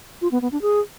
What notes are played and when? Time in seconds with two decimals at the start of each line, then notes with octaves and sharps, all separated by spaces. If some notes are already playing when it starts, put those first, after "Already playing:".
0.22 F4
0.32 B3
0.42 B3
0.52 D4
0.62 G#4